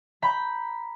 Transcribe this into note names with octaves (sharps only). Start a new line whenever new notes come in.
A#5 B5 G6